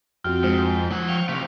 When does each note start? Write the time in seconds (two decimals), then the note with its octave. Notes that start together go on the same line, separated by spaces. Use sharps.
0.24 F2 C4 F#4 G5 F6
0.44 G#2 C5
0.92 F3 F#5
1.08 F5 G5 C#6
1.29 C3 D#3 A3 F5